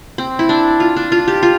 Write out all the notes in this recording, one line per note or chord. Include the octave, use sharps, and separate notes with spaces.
C4
E4
D4
F4
D4
F4
G4
F4